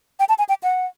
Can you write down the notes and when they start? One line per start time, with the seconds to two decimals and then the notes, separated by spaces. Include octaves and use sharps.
0.19 G5
0.29 A5
0.38 G#5
0.49 G5
0.63 F#5